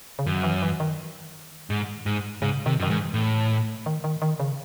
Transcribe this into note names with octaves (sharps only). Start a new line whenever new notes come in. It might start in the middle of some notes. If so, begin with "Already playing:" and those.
C#3
F#2 D#3
E3
E3
D#3
G#2
G#2
G#2 C#3
C3 D#3
F#2 D#3
G#2 E3
A2
D#3
D#3
D#3
C#3